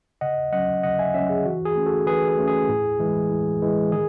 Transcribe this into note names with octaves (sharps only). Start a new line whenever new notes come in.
C#3 D#5 F#5
F#3 C#4 D#5 F#5
C#3 D#5 F#5
E5 G#5
F#3 C#4 C#5 E5
G#4
E3 F#4
G#4
A3 C#4
F#4 A4
E3 G#4 B4
G#4
A3 C#4
G#4
A2
E3 G#3
A2
E3 G#3
D#3 G#4